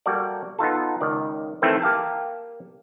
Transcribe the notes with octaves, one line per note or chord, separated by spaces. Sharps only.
G3 A#3 F#4 A4 D5
B3 D#4 F4 A4
C#2 D#3 D5
D#3 E3 A3 C4 E4 A4
A#3 G4 F5 A5